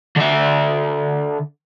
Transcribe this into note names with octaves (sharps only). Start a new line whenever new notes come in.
D3 E5